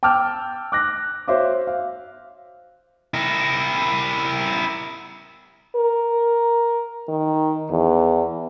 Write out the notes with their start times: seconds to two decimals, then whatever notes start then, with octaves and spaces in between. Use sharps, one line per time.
0.03 G5 A5 D6 E6 F6 G6
0.72 D6 F#6 A#6
1.28 F#4 C5 C#5 E5 F5 D6
1.67 F5
3.14 E4 A#4
5.76 A#4
7.09 D#3
7.71 E2